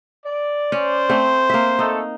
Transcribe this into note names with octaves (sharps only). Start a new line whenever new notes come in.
D5
C#4 C5
A3 C4
A#3 E5
A3 D#4 A4